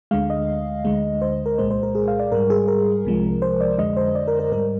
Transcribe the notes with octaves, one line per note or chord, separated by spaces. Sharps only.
D2 D3 G#3 F5
D#5
D2 D3 G#3
C5
A#4
C2 A#2 G#3 C5
C5
A#4
G#4
F5
D5
G#2 G3 A#4
G#4
A#4
C2 C3 F3 G#3
C5
D5
F2 D3 G#3 D#5
C5
D5
A#4
A#4
G#2 G3 A#4